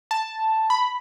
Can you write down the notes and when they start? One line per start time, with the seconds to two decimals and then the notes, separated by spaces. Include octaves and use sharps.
0.11 A5
0.70 B5